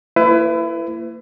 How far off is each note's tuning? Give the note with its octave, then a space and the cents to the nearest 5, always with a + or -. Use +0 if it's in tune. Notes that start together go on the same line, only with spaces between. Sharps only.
A#3 -20 E4 +25 B4 +30